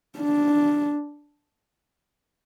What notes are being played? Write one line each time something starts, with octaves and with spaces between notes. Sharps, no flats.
D4